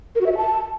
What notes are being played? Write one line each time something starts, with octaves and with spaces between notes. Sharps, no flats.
A#4
F#4
E5
F#4
A5